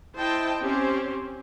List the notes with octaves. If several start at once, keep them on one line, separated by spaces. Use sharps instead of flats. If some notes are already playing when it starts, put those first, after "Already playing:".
E4 C5 D#5 G5 A5
C4 C#4 G4 C5